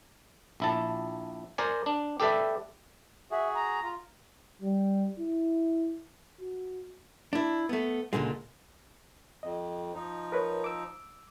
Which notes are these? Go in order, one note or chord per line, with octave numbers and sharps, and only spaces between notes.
A#1 E4 A5
A#4 C5 D5 G#5
D4
G4 A4 B4 D5 E5
F#4 G#4 E5
A#5
F4
G3
E4
F#4
D4 E4
A3 B3
C#2 F#2 A#2 D3 G#3
F2 D#5
F3 D#4
A#4 B4 C#5
D6 E6